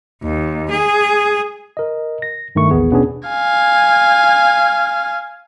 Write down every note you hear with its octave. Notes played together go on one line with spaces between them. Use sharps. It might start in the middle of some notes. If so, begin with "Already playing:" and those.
D#2
G#4
A#4 D#5
A#6
G2 D#3 A3 C#6
A1 D#2 B3 G#4
B2 B3 C#4 D4 G#4
F5 G#5